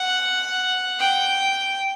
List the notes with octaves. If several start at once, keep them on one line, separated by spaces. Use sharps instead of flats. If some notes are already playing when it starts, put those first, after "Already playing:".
Already playing: F#5
G5